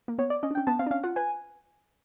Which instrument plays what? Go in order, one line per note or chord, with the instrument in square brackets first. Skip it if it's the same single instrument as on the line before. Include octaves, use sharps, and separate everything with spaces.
[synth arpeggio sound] A#3
[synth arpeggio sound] B3 [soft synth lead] C#5
[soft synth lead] D5
[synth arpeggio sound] C#4 [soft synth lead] D#5
[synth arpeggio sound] D4
[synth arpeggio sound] C#4 [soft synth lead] G5
[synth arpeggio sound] B3 [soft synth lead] A5
[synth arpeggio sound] C4 [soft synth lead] F5
[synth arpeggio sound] D4
[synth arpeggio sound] C#4 [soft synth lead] F5
[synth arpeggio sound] F4 [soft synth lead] F#5
[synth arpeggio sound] B4 [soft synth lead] G#5